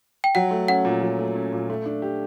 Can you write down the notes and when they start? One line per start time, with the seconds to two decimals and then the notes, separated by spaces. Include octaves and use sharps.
0.24 G5
0.35 F#3 F#5
0.51 A3
0.68 C#4 F#5
0.85 A#2
1.02 F#3
1.19 A3
1.35 C#4
1.53 A#2
1.70 A3
1.85 D4
2.02 G4